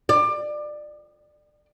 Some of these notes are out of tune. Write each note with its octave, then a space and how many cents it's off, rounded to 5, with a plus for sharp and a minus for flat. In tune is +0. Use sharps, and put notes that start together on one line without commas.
D5 +25